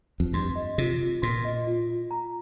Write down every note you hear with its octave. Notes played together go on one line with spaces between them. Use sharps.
F2
G2 C6
D#5
C3 F4
F4
A#2 C6
D#5
F4
F4
A#5